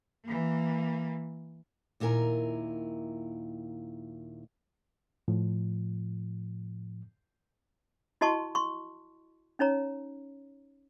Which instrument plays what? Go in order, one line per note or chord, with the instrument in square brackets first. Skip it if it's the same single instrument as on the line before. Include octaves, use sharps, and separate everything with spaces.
[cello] E3 A#3
[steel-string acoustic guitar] D#2 A#2 E4 A#4 G#5 A#5
[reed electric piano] A2 F3
[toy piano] E4 F#4 D#5 A5 C6 C#6
C6 C#6
C#4 D#4 C#5 A#5